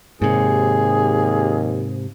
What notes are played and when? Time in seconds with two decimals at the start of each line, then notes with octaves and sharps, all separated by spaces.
0.22 D#2 G#2 C3 G#4